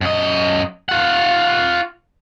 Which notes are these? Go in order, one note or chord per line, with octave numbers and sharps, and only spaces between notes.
F#2 D#5
F4 F#5